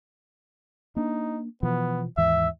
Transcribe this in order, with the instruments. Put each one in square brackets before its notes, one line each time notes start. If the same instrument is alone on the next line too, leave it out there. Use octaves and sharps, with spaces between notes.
[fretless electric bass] A#3 D4 [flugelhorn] D#4
[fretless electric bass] B2 E3 F3 [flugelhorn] B3
[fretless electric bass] D#2 G#2 E3 [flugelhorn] E5